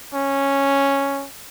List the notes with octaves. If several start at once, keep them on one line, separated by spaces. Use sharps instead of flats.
C#4